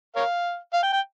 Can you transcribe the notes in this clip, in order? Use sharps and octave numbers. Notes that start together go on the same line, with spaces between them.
A#4 C#5 F5
F5
G5
G5